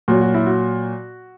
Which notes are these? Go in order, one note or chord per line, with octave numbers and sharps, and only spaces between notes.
A#2 F#3 F#4
F#4
E4
F#4